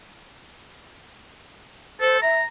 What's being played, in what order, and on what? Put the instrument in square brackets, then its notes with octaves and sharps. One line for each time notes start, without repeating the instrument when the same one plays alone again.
[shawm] A4 [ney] C5
[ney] E5 [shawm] A#5